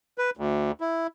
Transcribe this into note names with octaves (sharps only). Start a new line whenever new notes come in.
B4
D2
E4